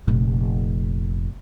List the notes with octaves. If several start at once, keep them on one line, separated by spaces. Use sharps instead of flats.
F1 A#2